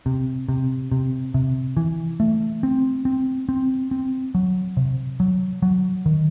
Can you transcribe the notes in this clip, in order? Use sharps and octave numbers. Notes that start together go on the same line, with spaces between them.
C3
C3
C3
C3
E3
A3
C4
C4
C4
C4
F#3
C3
F#3
F#3
D#3